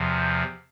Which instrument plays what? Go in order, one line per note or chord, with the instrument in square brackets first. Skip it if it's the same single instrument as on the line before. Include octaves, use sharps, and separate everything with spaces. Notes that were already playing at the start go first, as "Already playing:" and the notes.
Already playing: [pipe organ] E2 C3 F3